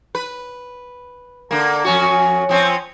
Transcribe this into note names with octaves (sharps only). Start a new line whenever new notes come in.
B4
D3 A#3
F2 C#4 F#4
F3 C4 C#4